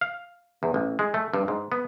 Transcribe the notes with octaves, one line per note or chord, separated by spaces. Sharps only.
F5
E2
A1
G#3
A3
G2
G#2
B3